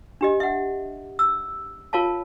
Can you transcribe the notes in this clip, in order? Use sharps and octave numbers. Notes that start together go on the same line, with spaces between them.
D4 G4 D#5
E5 F#5
E6
F4 A#4 C#5 F5 A5